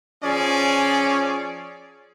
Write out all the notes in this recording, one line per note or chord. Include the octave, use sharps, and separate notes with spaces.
F3 C#4 G#4 D5